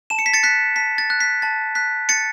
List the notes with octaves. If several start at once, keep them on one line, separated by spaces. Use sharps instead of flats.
A5 E7
C#7
B6
A6 C#7
F#6 B6
A5 B6
A6
F#6
B6
A5 A6
F#6 B6
A5 A6 C#7